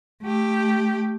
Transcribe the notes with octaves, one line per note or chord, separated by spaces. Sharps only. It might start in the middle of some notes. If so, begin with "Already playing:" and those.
A3 G4